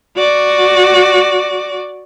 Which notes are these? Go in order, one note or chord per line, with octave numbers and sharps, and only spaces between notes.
F#4 D5